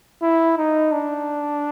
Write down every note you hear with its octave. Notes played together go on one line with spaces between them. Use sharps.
E4
D#4
D4